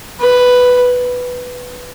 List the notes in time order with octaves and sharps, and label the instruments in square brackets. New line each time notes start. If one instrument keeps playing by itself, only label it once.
[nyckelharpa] B4